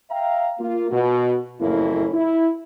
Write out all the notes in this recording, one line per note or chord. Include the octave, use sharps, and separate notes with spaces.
E5 F5 G5 A#5
A#3 F4
B2 F#4
F#1 F2 A2 A#3 C#4 E4
E4